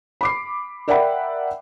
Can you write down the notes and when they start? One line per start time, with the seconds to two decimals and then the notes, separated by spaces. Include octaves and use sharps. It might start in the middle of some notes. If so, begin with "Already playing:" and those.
0.21 B5 D6 C7
0.88 A#4 D5 E5 F#5 G5 B5